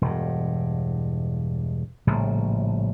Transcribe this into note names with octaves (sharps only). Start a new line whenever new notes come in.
E1 G2
A#1 A2 C#3 G3